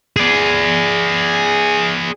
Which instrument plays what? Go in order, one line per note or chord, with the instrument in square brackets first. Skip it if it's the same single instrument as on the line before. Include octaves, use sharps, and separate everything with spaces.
[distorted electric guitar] G#4 D5